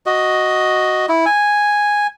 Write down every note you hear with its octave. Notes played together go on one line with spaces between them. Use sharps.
F#4 D#5
E4
G#5